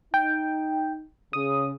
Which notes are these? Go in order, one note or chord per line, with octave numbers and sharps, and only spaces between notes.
D#4 G5
C#3 D#6